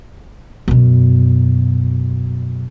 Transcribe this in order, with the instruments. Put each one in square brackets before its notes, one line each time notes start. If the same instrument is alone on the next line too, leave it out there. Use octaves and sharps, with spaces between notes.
[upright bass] F#2 B2